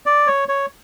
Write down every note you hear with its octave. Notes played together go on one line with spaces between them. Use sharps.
D5
C#5
C#5